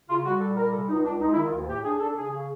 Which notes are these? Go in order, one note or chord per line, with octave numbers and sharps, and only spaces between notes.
C#3 F4
G3 F#4
A#2 A4
G3 A#4
C3 A4
C#2 D#4
C#2 D4
G#3 D#4
E4
D#3
F4
D2
A2 G4
D4 G#4
D4 A4
C#3 G#4
C#3